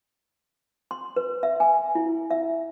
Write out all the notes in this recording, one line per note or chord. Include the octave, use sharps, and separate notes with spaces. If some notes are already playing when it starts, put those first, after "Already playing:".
C6
B4
E5
G#5
E4
E5